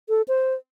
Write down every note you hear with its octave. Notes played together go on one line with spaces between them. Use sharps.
A4
C5